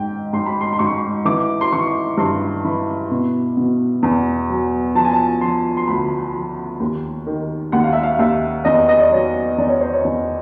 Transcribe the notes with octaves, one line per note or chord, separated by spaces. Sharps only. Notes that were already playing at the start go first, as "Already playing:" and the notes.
Already playing: G#2 G5
G#2 C6
B5
C6
C6
G#2 C#6
E3 D6
C6
E3 C#6
G2 C6
E3 B5
B2
B2
E2
F#3
F3 A5
G#5
A5
F3 C6
C6
D2 B5
F3
D#2
D#3
D#2 F#5
F5
E5
F5
D#2 E5
E2 D#5
D#5
D5
F#3 C#5
E2 D5
C#5
C5
C#5
E2